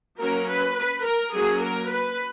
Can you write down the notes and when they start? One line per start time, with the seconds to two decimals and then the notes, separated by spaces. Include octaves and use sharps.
0.20 F#3 A#3 C#4 A#4
0.49 B4
0.78 B4
1.05 A#4
1.34 F#3 A#3 C#4 G#4
1.62 A#4
1.91 B4